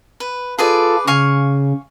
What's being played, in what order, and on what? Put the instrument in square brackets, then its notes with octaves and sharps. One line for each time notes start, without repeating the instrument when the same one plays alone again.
[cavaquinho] B4
[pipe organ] F4 A4 [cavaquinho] G#4 B4 D5
[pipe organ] C#3 [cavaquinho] F5 G#5 C#6